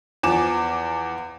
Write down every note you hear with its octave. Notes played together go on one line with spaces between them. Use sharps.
E2 F3 G#5 D6 E7